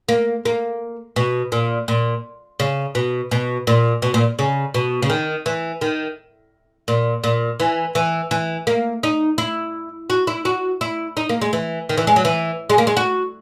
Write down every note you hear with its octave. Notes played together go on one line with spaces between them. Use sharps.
A#3
A#3
B2
A#2
A#2
C#3
B2
B2
A#2
B2
A#2
C#3
B2
C#3
D#3
E3
D#3
A#2
A#2
E3
E3
E3
A#3
D#4
E4
F#4
E4
F#4
E4
D#4
A#3
G#3
E3
D#3
E3
G#3
F#3
E3
G#3
A#3
G#3
F#4